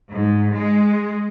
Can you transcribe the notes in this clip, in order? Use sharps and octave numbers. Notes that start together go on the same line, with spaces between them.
G#2
G#3